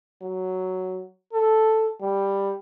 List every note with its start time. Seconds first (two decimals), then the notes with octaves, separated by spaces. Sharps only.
0.22 F#3
1.33 A4
2.01 G3